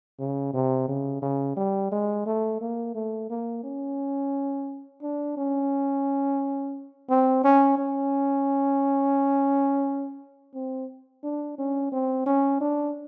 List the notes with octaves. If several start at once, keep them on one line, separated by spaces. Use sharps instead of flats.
C#3
C3
C#3
C#3
G3
G#3
A3
A#3
A3
A#3
C#4
D4
C#4
C4
C#4
C#4
C4
D4
C#4
C4
C#4
D4